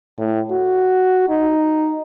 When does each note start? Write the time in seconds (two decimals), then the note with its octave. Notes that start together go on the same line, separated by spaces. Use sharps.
0.18 A2
0.51 F#4
1.29 D#4